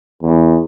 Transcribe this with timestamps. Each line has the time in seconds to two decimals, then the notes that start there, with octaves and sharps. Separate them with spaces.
0.22 E2